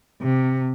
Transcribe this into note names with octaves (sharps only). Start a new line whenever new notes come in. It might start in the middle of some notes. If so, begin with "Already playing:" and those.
C3